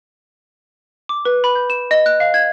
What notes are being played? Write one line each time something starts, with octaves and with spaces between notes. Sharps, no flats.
D6
B4
B5
G6
E7
D#5
F#6
F5
G#6